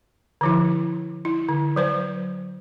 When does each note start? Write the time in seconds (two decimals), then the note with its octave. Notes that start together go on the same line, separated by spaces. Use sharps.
0.41 D3 F3 E4
1.25 E4
1.49 D3
1.76 F#3 B4 C5